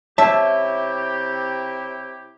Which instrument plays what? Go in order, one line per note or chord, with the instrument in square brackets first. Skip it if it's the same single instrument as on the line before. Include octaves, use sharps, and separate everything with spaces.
[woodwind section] C3 E4 G4 [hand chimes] C#5 [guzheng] E5 [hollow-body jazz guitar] A5